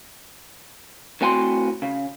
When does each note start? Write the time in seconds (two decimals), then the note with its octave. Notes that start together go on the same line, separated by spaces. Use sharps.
1.21 A2 C4 F#4 G#5 A5 C6
1.82 C#3